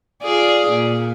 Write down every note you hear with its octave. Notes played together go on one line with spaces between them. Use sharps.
F4 G#4 D5
A#2